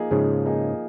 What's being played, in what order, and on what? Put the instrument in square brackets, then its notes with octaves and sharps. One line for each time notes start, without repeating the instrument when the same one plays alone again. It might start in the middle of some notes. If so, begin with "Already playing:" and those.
Already playing: [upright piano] F3 A#3 D#4 G#4
[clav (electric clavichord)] G#2 C#3 [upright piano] F3
[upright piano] A#3 D#4 G#4